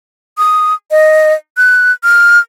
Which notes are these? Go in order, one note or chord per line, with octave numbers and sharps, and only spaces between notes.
D#6
D#5
F#6
F6